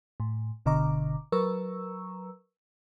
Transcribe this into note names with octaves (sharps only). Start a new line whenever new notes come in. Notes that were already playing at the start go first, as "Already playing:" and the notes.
A2
G1 B2 D3 D#5 A#5 D6
F#3 A#4 B4 A#5 C#6 E6